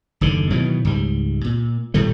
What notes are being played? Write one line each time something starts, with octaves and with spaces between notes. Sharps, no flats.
F#1 D#2 D3
B2 D#3 E3 F#3
C#2 G#2 G3
A#2
D#1 A2 G3 A3